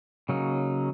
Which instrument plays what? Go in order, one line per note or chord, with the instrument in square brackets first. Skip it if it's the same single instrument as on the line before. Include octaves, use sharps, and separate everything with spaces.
[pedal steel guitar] C#3 F#3 A#3 D#4